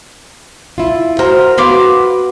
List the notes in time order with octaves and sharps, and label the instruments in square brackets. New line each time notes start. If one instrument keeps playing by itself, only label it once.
[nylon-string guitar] E4 F4
[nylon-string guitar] F#4 C5 [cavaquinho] A#4
[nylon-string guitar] B3 F#4 F5 [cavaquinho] B4 C6 D6
[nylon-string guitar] F#4